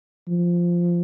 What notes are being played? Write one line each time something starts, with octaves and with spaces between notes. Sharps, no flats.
F3